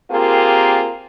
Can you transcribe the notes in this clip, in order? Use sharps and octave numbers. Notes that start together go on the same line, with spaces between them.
A#3 C4 F4 G4 G#4 A#4